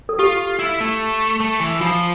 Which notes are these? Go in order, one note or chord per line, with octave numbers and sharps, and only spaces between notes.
A4
F4 G4
E4
A3
A3
E3
F3 F4